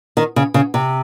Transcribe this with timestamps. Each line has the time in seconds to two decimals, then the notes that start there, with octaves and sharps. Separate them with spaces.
0.17 D#3
0.36 C#3
0.54 C#3
0.74 C3